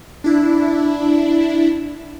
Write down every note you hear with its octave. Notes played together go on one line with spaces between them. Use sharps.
D4 E4